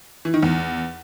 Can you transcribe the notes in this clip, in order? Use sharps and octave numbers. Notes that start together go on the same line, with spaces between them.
E3
D#3
E2